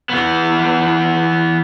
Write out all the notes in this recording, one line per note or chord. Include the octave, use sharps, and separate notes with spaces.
E3 B3